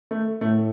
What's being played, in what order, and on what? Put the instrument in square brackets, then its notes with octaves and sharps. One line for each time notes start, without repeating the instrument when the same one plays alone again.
[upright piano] A3
[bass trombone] A2 [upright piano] A3